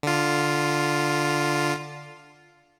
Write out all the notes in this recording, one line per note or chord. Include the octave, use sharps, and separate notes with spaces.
D3 F4